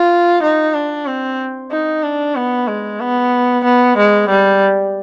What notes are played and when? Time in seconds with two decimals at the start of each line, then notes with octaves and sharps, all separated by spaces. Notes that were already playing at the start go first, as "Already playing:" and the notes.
Already playing: F4
0.42 D#4
0.74 D4
1.06 C4
1.71 D#4
2.03 D4
2.35 B3
2.68 G#3
3.00 B3
3.64 B3
3.97 G#3
4.29 G3